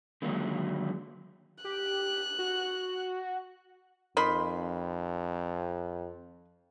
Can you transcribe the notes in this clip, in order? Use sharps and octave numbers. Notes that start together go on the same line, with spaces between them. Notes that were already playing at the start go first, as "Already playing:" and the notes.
D3 D#3 F#3 G#3 A#3
G4 F#6
F#4
F2 D#3 B5 C6